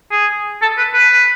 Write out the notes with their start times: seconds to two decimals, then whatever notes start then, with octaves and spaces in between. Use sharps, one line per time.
0.11 G#4
0.62 A4
0.78 B4
0.94 B4